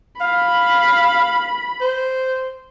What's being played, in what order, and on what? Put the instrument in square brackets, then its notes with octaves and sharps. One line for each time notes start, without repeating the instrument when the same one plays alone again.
[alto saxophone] F5 [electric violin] B5
[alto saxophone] C5